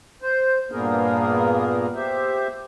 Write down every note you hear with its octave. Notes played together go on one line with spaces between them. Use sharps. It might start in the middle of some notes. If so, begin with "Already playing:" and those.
C5
G2 A#2 A#3 B3 G#4 A#4
G4 C5 E5